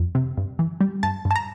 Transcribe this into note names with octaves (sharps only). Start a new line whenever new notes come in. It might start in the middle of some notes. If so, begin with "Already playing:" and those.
Already playing: F2
C3
G2
E3
G3
G2 A5
G2
A5
A#5